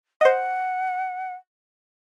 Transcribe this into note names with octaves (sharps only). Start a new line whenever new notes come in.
C5 D#5 F#5